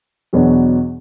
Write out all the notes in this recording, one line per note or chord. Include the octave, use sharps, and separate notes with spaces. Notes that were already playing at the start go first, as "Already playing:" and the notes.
E2 B2 F#3 B3 D4